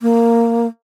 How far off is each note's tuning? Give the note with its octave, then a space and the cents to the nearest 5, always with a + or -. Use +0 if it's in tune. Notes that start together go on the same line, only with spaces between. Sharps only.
A#3 -10